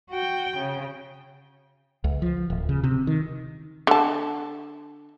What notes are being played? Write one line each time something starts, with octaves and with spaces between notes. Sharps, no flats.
F#4 G5
C#3
C#2
F3
D1
C#3
C3
D#3
D3 A5